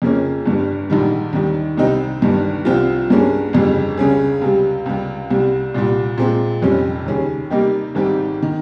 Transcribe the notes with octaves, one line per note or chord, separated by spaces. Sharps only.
F2 C#3 F3 A#3 C#4
G1 G2 G3
A#1 G#2 D#3 G3
D#2 D#3 G3
C2 C3 G3 C4 D#4
G1 G2 D#3 G3
C2 C3 F3 C4 F4
G2 G3 A#3 C#4 G#4
G1 F2 C#3 G3
C#2 C#3 G3 C#4 G#4
C#2 C3 G3
C#2 C3 G3
C2 C3 G3
C2 A#2 G3
A#2 G#3 C4
F1 F2 C3 G3 C#4
D#2 C#3 G3 C#4 G#4
C3 G3 A#3 D#4 G4
G#1 G#2 G3 C4 G4
D#3